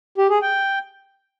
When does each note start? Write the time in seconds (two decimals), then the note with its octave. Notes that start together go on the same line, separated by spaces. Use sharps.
0.18 G4
0.30 G#4
0.42 G5